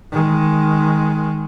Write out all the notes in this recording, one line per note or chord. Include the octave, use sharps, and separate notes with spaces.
D#3 G#3